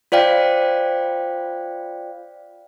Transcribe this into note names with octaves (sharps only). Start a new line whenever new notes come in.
F4 C5 D5 F5 G5